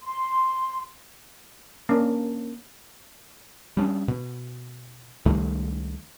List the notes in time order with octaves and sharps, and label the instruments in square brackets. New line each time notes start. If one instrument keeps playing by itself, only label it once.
[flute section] C6
[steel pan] A#3 C#4 D4
[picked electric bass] G3 C#4 D4
B2
C#2 D#3 G3 A3